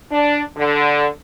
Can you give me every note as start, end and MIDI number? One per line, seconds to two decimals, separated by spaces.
0.11 0.42 62
0.57 1.06 50